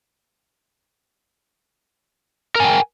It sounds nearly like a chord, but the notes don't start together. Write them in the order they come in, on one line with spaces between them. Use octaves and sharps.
A#4 G#5 G5